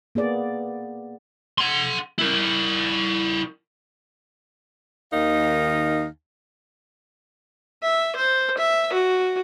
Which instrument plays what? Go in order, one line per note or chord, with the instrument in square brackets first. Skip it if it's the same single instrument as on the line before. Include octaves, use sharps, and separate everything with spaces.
[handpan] A#3 B3 G#4 D5
[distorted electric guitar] F#5 C6
E4 A#4
[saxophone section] D#2 D#3 D#4 F5
[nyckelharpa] E5
C5
E5
F#4